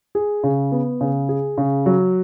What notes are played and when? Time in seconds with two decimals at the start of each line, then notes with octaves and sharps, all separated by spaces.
0.15 G#4
0.44 C#3
0.72 B3
1.01 C#3
1.29 G#4
1.58 C#3
1.86 F#3